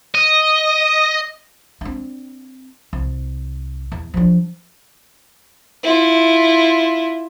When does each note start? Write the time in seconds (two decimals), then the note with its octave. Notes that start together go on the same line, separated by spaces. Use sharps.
0.15 D#5
1.81 C4 D4
2.93 C2
3.92 E2
4.14 F3 D4
5.84 E4 F4